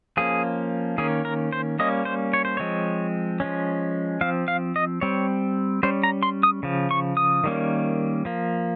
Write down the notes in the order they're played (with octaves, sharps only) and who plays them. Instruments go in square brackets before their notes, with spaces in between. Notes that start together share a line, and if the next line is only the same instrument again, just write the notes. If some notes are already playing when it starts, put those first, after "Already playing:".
[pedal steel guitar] F3 A#3 C#4 G#4
D#3 A#3 C#4 G#4
A#4
C5
G3 A#3 C#4 D#5
C5
C#5
C5
F3 G#3 C4 C#5
F3 G#3 C#4
F3 C4 F5
F5
D#5
G3 C4 C#5
G3 C#4 C5
A#5
C6
D#6
C#3 F3
C#6
D#6
D#3 G3 A#3 C#4
F3 A#3